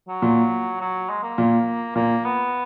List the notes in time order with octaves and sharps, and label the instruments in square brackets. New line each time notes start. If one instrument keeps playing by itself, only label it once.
[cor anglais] F#3
[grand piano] A#2
[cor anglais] F#3
G#3
A#3
[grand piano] A#2
[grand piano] A#2 [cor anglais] A#3
[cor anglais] B3